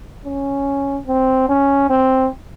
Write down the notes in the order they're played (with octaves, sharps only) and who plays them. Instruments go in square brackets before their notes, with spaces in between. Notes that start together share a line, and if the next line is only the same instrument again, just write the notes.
[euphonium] C#4
C4
C#4
C4